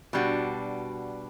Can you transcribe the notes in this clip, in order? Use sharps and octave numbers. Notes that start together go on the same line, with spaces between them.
B2 G3 D4 F#4